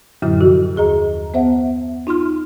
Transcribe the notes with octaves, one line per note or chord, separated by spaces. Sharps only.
F#2 A2 D3 F#3 E4 F6
C3 F3 F#4
D#2 G#4 D#5 A#5
B3 C5 E5 F#5
D#4 F4 C6 F6